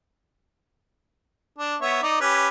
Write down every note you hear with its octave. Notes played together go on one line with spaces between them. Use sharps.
D4
B3 C#5 E5
D#4 D5
C#4 G4 B4